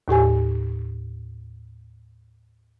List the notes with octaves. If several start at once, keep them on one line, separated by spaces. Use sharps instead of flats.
D#2 A2 G4 G#5